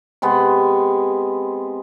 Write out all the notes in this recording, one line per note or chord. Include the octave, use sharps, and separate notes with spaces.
C3 G#3 B3